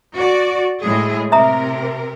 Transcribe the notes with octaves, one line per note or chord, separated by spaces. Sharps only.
F#4 D5
A2 G#3 G#4
C3 A#4 E5 A#5 D#6